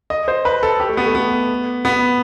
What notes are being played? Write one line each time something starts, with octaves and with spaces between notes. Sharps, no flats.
D#5
C5
B4
A4
G4
A3
B3
A3
B3
B3